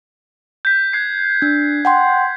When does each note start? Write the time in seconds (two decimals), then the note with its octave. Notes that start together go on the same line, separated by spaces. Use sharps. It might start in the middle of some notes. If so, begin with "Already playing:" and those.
0.65 G6 B6
0.93 F#6 G#6 C7
1.42 D4
1.85 F#5 G5 C6